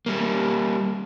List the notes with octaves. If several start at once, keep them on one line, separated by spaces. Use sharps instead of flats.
G3 A#3